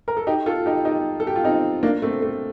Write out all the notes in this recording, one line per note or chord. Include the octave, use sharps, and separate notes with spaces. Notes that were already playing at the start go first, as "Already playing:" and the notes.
A#4
A4
D#4 G4
F4 A4
D#4 G4
D#4 G4
A4
G4
F4
C4 D#4
A#3 D4
A3 C4
A3